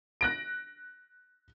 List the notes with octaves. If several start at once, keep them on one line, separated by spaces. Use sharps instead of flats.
F#6 A#6 D7